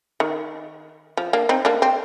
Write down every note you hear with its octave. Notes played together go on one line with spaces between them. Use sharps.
D#3
F3
A#3 D4
C4 D#4
A#3 D4
C4